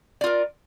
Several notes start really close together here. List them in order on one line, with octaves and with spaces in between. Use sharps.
D5 F4 A#4